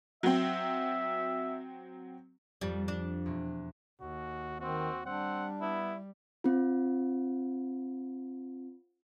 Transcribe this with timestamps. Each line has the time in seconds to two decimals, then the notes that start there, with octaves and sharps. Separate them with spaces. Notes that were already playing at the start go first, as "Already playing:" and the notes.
0.23 F#3 C4 E5
2.61 F2 G3
2.88 D4
3.26 E2 B2
4.01 D#2 F#4
4.61 D#3 C4 F#4
5.06 G3 C4 D4 F#5
5.61 B3 E4
6.44 C4 F4